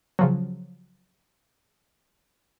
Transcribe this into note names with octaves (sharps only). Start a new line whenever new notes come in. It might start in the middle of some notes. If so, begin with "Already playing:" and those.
C#3 F3 F#3